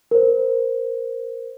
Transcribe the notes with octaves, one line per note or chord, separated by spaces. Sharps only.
A#4 C5